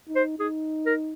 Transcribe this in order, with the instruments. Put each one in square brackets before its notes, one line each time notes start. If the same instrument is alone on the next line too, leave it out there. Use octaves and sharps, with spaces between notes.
[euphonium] D#4
[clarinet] C5
[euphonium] D#4 [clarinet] G#4
[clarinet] A#4